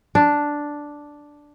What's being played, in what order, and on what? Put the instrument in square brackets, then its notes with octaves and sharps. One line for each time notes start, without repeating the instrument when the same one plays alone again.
[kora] D4